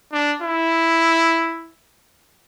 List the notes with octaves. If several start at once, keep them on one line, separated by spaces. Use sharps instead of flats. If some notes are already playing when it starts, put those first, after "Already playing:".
D4
E4